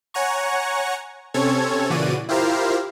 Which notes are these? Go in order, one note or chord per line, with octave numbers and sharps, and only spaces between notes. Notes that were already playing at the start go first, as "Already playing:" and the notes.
C#5 F#5 G#5 A#5 C#6
C3 C4 C#4 A4 C#5 G#6
A#2 C#3 E3 F#4 D5 D#7
E4 F4 G4 A#4 C5 F5